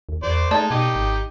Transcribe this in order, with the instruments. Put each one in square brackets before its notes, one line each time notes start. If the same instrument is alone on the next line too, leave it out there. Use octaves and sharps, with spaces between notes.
[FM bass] D#2
[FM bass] E2 [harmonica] C5 D5
[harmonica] G#3 D#4 [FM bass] A3 [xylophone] D5 A5
[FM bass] B2 [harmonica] D#4 G4
[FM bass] G#1